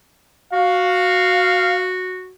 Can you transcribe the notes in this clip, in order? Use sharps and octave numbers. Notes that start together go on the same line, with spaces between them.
F#4 F5